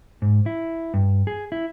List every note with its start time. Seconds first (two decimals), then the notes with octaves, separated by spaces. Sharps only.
0.22 G#2
0.46 E4
0.94 G2
1.27 G#4
1.52 E4